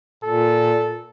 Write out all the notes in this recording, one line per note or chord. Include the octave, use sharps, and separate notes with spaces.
A#2 A4